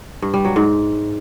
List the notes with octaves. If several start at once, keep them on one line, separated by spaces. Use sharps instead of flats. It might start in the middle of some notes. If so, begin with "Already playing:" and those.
G2
G3
F#3
G#2